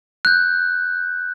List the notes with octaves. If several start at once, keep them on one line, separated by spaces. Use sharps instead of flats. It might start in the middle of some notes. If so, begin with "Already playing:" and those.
F#6 G6